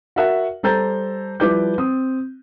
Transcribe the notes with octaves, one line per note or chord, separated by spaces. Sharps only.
F#4 A#4 E5 F#5
G3 A4 C5 A#5 G6 A6
F3 G3 E4 B4 D6 G6
C4 D#6